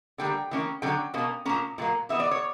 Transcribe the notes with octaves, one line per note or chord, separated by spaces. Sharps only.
D3 G3 A#3 G5
E3 A#3 C#4
D3 F#3 C#4 G5
B2 A#3 C#4
A#2 A#3 C#4 A#5
A#2 F#3 A#3
E3 B3 E5
D5
C#5